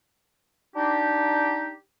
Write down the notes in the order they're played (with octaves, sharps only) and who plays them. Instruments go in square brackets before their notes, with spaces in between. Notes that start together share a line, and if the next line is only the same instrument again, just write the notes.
[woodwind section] D4 D#4 G4